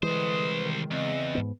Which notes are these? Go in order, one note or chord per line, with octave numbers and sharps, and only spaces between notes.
C2 D3 E3 G#3 B4 C5 D#5 D#6
D#3
E2 C#3 C4 D#5
G#2 B3